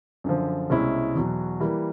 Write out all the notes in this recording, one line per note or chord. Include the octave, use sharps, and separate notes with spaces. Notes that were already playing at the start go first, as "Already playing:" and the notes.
F#2 D3 F3
C2 B2 G#3 C#4 E4
E2 B2 F#3
E3 G3 A#3